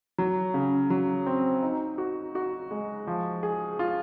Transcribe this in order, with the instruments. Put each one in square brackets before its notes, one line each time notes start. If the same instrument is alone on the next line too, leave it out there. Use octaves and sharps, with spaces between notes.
[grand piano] F#3
C#3
F#3
C4
D#4
F#4
F#4
G#3
F3
G#4
F4